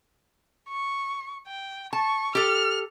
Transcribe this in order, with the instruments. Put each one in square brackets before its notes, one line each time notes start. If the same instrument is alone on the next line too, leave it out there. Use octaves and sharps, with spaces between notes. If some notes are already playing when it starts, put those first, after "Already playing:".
[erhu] C#6
G5
[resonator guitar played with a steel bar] A5 [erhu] C#6
[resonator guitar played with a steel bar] G4 A4 [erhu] F6